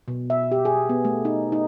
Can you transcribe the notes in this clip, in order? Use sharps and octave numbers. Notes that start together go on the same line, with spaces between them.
B2
E5
G4
G#4
B3
A3
D#4
D#4